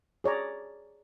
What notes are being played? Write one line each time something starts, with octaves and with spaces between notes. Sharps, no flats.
G#4 C#5 D5 A#5